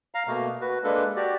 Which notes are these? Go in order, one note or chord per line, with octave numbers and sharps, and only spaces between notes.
F5 A#5
B2 A3 A#3
F#4 B4
G#3 A#3 D4 A4 B4
F#4 G4 D5